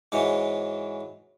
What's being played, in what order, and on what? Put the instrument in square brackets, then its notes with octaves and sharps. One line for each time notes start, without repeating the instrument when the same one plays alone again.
[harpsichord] G#2 E3 F#3